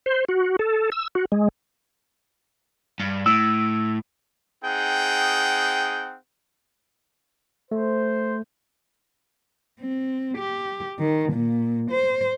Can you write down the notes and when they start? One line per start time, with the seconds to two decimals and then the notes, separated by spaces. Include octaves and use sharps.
0.06 C5
0.29 F#4
0.59 A4
0.92 E6
1.15 F#4
1.32 G#3
3.00 G2
3.26 A2 E6
4.64 C4 D#4 G#4 F#5 G5
7.71 A3 C5
9.80 C4
10.37 G4
10.99 D#3
11.33 A#2
11.91 C5